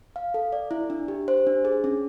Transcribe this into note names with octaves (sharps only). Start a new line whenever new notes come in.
F5
A4
D5
E4
D4
G4
C5
D4
G#4
C#4